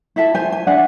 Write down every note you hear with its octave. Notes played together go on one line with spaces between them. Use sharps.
E4 A4 E5 A5
C5 G#5
G#5
D4 E5 F#5